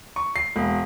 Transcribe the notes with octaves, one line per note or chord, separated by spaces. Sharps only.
C#6
C7
E1